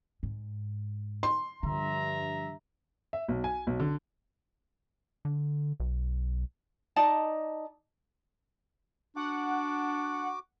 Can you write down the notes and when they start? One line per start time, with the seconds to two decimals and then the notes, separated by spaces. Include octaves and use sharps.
0.23 G#2
1.23 C6
1.63 G2 D3 F3 E5 A#5
3.13 E5
3.28 B1
3.44 G#5
3.67 B1
3.80 D3
5.25 D3
5.80 B1
6.96 D#4 D5 D#5 A5
9.16 D4 F#4 F#5 D6